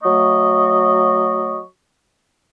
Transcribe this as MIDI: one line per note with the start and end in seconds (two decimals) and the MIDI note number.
0.03 1.60 54
0.03 1.60 57
0.03 1.60 75
0.03 1.60 85